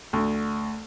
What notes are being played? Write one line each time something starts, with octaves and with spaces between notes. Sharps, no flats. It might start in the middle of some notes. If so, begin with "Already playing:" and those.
D2